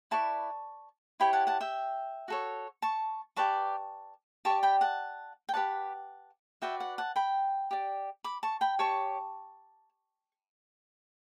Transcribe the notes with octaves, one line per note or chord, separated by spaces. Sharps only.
E4 B4 D5 A5 C#6
E4 G4 C#5 G5 B5
F#5 A5
F#5 A5
E5 G5
F#4 A4 C#5
A5 C#6
G4 B4 D5 A5 C#6
G4 D5 A5 C#6
G5 B5
F#5 A5
G5
G4 B4 D5 F#5 A5
F#4 B4 D5 E5 G5
F#5
F#5 A5
G5 B5
G4 D5
B5 D6
A5 C#6
G5 B5
G4 C#5 A5 C#6